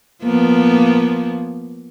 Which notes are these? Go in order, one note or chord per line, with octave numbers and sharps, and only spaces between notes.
F3 A#3 B3